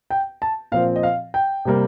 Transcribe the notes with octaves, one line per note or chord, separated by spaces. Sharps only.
G5
A5
A#2 F3 C4 F5
D#5
F5
G5
C3 G3 A#3